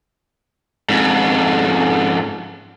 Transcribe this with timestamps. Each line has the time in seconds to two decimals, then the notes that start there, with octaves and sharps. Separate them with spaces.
0.89 F2 G#2